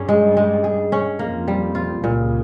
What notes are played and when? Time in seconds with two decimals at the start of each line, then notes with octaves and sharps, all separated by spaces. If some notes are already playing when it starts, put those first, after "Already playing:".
Already playing: G2 G3 C#4 G#4
0.09 G#3
0.37 G#3
0.64 G#4
0.92 C#4
1.19 F2 F3 A#3
1.48 G3
1.75 F4
2.03 C#2 A#2 C#3